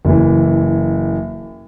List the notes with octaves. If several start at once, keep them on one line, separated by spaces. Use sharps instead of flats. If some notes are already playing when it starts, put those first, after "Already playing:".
F#1 E3